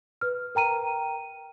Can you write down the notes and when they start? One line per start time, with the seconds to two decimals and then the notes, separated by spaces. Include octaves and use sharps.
0.21 B4 F6
0.55 A#4 G5 A#5 D#7